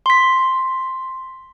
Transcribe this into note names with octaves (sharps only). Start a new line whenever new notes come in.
C6 B6